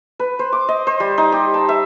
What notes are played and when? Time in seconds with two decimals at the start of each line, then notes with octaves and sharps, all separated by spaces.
0.19 B4
0.39 C5
0.53 D6
0.68 D#5
0.87 C5
1.00 G3
1.18 D#4
1.32 G4
1.54 A5
1.69 E5